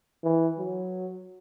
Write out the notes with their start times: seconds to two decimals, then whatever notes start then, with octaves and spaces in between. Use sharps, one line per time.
0.24 E3
0.58 F#3